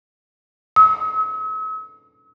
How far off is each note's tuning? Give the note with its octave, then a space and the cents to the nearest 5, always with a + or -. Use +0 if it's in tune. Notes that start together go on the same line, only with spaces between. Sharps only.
E6 -45